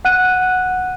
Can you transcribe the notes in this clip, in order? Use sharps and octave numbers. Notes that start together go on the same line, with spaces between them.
F#5 F#6 D#7